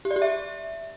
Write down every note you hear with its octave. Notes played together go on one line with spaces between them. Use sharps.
G4
D5
G4
E5